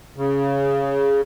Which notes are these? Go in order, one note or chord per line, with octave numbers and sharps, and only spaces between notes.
C#3